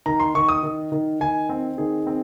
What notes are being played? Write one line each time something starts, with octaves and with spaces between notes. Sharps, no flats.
D#3 A#5
C6
D#3 C#6
D#6
D#3
D#3
D#3 G#5
C4
D#3 G#4
C4